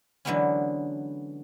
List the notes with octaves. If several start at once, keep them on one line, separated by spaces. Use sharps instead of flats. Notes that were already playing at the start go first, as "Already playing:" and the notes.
D3 E3 F#3 G#3 B3 C#4